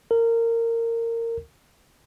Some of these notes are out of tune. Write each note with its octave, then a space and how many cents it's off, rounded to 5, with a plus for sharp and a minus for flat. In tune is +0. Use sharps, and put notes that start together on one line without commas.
A#4 -20